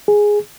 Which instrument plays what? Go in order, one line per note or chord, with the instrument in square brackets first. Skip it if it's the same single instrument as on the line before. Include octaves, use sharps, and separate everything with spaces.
[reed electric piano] G#4